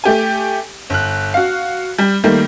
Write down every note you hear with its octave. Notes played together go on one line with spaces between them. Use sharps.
A3 G4 G#5
G1 F#6
F#4 F5
G3
D#3 G3 A3 A#3